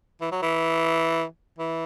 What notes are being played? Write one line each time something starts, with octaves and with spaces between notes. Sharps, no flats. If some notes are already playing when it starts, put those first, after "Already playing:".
E3
F#3
E3
E3